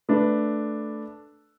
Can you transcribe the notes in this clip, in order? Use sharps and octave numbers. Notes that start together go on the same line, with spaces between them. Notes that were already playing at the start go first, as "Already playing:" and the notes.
A3 D4 B4